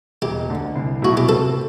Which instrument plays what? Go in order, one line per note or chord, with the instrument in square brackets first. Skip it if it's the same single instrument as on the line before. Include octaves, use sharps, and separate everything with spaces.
[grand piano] E1 [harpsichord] G4
[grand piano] D2 D3 A3
C2
[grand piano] B2 F#3 A3 E4 [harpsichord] F#4
[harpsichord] G4
[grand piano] C3 [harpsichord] A4